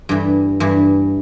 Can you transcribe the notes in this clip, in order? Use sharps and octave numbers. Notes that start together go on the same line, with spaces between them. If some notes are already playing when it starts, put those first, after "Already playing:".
G2 E3
G2 E3